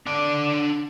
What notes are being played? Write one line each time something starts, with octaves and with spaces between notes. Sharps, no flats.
D3 D4